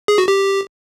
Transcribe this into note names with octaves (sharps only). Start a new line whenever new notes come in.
G#4
F#4
G4